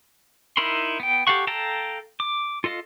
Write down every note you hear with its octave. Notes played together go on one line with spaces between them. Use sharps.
D#4 E4 A#4 B5 C6
B3 G5
G4 A4 F5 F#5 C#6
A4 F5 G5 A5 A#5
D6
F4 A4 D#5 F5